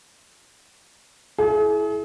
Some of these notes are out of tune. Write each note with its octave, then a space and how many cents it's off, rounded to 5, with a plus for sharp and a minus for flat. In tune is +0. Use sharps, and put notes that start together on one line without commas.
E4 +0 G#4 +40